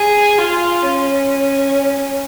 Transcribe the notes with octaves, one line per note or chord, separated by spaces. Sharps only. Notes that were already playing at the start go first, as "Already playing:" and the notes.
Already playing: G#4
F4
C#4